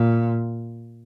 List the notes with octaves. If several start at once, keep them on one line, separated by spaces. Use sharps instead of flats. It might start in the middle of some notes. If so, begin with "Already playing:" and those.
Already playing: A#2